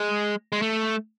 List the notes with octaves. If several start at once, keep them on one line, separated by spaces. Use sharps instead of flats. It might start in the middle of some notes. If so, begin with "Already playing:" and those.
Already playing: G#3
G#3
A3